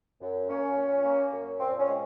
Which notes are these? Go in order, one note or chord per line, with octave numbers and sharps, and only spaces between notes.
F#2
A#3 C#4
A#2
A#3
F#2
A#2 C4
C#4
G#3